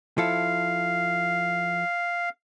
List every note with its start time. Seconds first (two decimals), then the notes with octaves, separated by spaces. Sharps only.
0.18 F3 E4 A4 F5